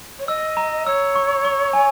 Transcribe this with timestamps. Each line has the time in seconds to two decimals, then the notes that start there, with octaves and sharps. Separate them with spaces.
0.20 C#5
0.28 D#5 E6
0.57 A#5
0.86 C#5 E6
1.15 C#6
1.45 C#6
1.73 G#5